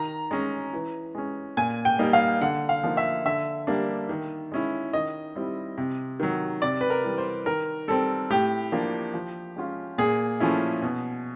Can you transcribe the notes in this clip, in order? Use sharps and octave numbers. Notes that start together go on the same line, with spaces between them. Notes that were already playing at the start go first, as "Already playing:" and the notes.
Already playing: D#3 A#5
G#3 C#4
E3
G#3 C#4
A#2 G#5
G5
G3 A#3 D#4
F5
D3 F#5
F5
F3 A#3 D#4
E5
D3 E5
G3 A#3 D4
D#3
G#3 C#4 E4
D#3 D#5
G3 C4 E4
C3
D#3 F#3
C3 D5
B4
A#4
E3 G3
C5
D#3 A#4
G3 C4 A4
A2 G4
F3 A#3 D4
F3
G#3 C#4 F4
A#2 G#4
F3 A3 C#4 E4
B2